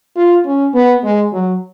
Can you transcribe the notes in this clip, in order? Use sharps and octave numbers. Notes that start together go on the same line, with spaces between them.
F4
C#4
B3
G#3
F#3